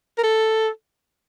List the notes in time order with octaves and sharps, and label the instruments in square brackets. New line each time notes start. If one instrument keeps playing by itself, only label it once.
[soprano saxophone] A#4
A4